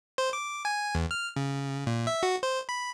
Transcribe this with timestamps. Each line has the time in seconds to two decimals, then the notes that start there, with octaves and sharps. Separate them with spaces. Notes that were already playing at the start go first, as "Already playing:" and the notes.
0.18 C5
0.33 D6
0.65 G#5
0.95 E2
1.11 F6
1.36 C#3
1.87 A#2
2.07 E5
2.23 F#4
2.43 C5
2.69 B5